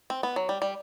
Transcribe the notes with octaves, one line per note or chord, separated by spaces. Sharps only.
C4
B3
F#3
G3
G3